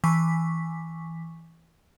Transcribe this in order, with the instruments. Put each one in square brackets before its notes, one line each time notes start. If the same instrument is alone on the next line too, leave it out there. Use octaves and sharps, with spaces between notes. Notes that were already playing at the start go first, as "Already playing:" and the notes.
[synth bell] E3 G#5 C#6 D6 B6